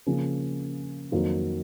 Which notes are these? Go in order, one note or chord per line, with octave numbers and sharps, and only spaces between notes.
C#3 F3 A#3 C#4 G#4
F2 D#3 F#3 A#3 F4